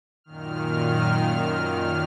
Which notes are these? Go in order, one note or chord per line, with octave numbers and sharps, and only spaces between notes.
F#2 A#2 D#3 F6